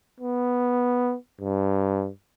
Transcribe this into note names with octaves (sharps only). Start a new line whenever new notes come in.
B3
G2